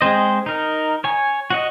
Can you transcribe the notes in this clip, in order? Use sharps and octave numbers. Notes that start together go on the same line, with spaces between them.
G#3 C4 C5 D#5
D#4 A#4
C#5 G#5
F#4 C#5 D#5